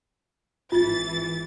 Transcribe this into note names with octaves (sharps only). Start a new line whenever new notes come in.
G#1 E3 F4 A6